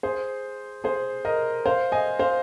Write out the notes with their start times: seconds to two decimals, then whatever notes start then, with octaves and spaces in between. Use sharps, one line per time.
0.03 G#4 C5
0.84 G#4 C5
1.25 A#4 D#5
1.65 C5 F5
1.92 D#5 G#5
2.19 C5 F5